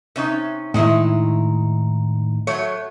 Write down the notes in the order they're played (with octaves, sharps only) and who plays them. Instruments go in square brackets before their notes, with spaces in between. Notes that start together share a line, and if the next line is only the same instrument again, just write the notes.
[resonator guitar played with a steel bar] C3 C#4 D#4
[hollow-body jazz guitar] A2 D#3 [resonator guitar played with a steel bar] G#3 D#4 E4
[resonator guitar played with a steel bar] F#3 A3 C#5